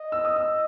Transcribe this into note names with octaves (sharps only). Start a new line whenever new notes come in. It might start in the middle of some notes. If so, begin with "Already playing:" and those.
Already playing: D#5
E6
D#6
E6